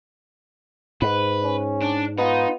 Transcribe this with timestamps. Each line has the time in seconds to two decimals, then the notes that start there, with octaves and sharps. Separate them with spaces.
1.02 G#2 B4
1.43 C#4
1.82 D4
2.18 B3 D#4 F4